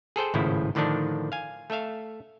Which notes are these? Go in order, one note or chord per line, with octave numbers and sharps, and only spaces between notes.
G#4 A4 C5 G5
G#1 A2 C#3 F3 E4
A2 D3 D#3 F3 D4
F5 G#5
A3 A4 E5 F5